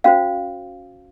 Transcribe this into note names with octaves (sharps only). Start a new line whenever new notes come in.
C#4 F#4 C5 F5